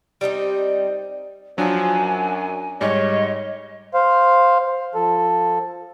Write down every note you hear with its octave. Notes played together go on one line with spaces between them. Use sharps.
G3 C4 D4 D#4
F3 F#3 D4 G#5
F#2
G#2 G3 C#5 D#5
C5 F5
F3 A4